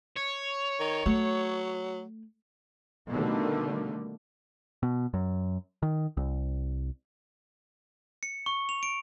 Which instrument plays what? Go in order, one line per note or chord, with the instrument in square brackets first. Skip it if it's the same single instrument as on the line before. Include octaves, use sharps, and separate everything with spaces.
[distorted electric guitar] C#5
[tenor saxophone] D#3
[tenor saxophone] F#3 [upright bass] A3
[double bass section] B2 D3 D#3 G3 A3 A#3
[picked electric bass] B2
F#2
D#3
C2
[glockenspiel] C#7
C#6
F7
D7